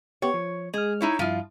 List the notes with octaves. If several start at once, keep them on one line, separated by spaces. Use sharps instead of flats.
B3 G4 C#5
F3
G#3 G#4 F6
D#4 E4 C#5
G2 F3 E4 F4